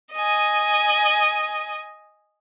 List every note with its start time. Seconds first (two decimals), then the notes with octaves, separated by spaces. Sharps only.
0.14 D#5 G#5